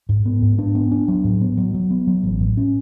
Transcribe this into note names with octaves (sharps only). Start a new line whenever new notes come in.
G#2
B3
G#2
D4
B3
D4
F#3
A2
B3
F#3
F#3
B3
F#3
A1
A2
C#4